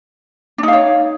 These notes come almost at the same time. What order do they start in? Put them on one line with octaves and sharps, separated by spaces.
D4 D#4 F5 C#5